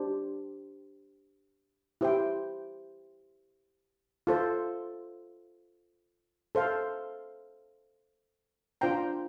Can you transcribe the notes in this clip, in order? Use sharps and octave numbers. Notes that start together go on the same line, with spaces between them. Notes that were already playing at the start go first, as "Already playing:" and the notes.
Already playing: D4 G4 C5
E4 G4 C5 G5
F4 A4 C5
A4 C5 F5
D4 F4 C5 G5 A#5